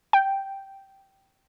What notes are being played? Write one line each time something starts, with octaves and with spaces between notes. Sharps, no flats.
G5